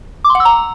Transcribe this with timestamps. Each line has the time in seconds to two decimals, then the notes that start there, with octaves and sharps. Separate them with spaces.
0.24 D6
0.30 C6
0.35 F#5
0.40 E6
0.45 A#5